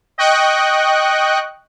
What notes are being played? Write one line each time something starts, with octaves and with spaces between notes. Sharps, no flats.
D#5 G5 C#6 F#6